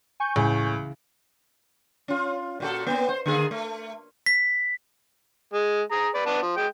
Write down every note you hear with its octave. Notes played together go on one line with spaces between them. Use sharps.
G#5 C#6 G6
C#2 A2 C#3 E3
C#4 F4
A#2 F#4 A4
A#3 B3
C5
D3 A#3 G#4
A3
B6
G#3
G#4 A#5
B4 D5
B3 D4 A5
F3
G#3 G5